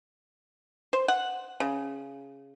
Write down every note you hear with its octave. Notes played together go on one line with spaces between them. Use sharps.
C5
F#5
C#3